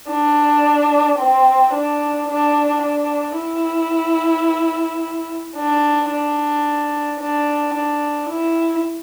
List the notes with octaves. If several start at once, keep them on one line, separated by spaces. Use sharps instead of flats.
D4
C4
D4
D4
D4
E4
D4
D4
D4
D4
E4